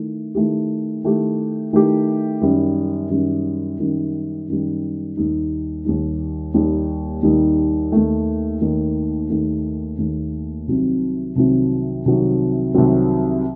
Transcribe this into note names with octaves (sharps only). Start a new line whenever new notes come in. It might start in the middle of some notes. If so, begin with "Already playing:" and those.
Already playing: D#3 A3 E4
D#3 A3 E4 G4
D#3 A3 E4 G4
D#3 A3 E4 G4
F#2 D#3 G3
F#2 D#3 G3
F#2 D#3 G3
F#2 D#3 G3
D#2 D#3 G3 D#4
D#2 D#3 G3 D#4
D#2 D#3 G3 D#4
D#2 D#3 G3 D#4
D#2 D#3 A3
D#2 D#3 A3
D#2 D#3 A3
D#2 D#3 A3
C2 C3 D#3 F#3 C4
C2 C3 D#3 F#3 C4
C2 C3 D#3 F#3 C4
C2 C3 D#3 F#3 C4